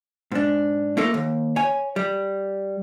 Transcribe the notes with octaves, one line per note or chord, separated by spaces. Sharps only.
G#2 D4
A3 A#3 D#4 F4 A4 A#4
D#2
C#5 G#5
G3